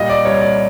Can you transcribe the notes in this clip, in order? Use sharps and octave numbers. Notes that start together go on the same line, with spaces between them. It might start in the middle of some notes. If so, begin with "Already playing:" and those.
Already playing: A#2 G3 D#5
D5
C2 C#5
D5